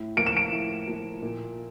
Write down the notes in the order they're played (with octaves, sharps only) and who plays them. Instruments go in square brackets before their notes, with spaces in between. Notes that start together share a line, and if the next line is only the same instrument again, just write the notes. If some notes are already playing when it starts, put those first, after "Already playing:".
Already playing: [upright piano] A2
[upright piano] F3 A#3 [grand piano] D7
[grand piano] E7
D7
[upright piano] A2
F3 A#3
A#2